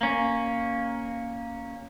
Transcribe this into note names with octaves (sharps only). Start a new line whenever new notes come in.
A#3 C#4